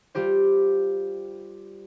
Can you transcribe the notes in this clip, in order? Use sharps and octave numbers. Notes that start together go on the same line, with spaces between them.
G3 F4 G4 C5